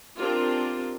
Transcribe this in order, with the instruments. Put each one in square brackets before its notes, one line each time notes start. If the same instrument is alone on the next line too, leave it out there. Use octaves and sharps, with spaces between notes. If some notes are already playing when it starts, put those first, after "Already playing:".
[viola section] C4 D4 F4 G4 A#4